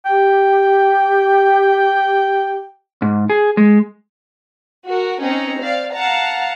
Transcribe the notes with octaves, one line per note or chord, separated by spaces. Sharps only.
G4 G5
G#2
G#4
G#3
F#4 A#4
C4 C#4 D#4 A#5
C5 D5 F5
F5 F#5 A5 A#5